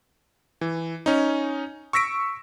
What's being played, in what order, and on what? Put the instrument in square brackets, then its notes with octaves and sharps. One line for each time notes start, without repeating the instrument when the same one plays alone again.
[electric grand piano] E3
C#4 D#4
C#6 E6 A#6 B6 D7